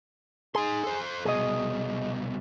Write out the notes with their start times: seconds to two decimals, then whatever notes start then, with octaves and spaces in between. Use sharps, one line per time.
0.55 D#4 G#4 C6
0.84 A4 C5
1.25 C2 B2 G#4 D#5